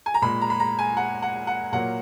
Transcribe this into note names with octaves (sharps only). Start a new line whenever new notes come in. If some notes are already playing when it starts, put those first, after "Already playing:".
G#5
A#5
A#2 G#3 B5
A#5
B5
A#5
G#5
F#5
F#5
F#5
A#2 F#3 A#3 F#5